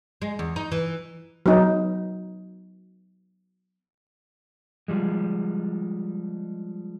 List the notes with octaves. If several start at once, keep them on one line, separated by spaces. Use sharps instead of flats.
G#3
E2
D#4
E3
F#3 B3 D#4
F3 G3 G#3